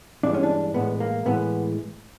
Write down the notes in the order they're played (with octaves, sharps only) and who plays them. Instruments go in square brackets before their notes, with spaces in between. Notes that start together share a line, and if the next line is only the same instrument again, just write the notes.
[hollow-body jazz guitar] G2 E3 G#3 D4
C#4
D4
A2 E3 G#3 B3
A#3
A2 E3 G#3 B3